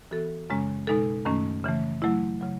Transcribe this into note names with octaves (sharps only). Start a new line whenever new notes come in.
E3 B3 F#4 A4
F#2 C#3 G#3 C#4
B2 G#3 D#4 A4
F#2 D#3 A3 C#4
C#3 E3 A3
F#3 A3 E4
C#3 F#3